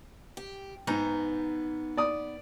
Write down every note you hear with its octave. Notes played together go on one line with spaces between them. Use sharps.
G4
G#2 B3 D#4 A#5
D5 D#6